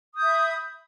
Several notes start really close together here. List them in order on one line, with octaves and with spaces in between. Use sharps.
D#6 G6 E5 B5